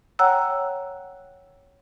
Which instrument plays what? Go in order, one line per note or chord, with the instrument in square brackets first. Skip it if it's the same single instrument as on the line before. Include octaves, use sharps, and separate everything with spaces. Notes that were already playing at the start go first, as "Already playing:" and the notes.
[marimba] C#5 F#5 G5 A#5 E6 F#6